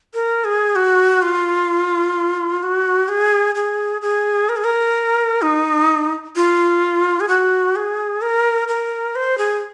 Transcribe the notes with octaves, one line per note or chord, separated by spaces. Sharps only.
A#4
G#4
F#4
F4
F#4
G#4
G#4
G#4
A#4
G#4
A#4
D#4
F4
G#4
F#4
G#4
A#4
A#4
C5
G#4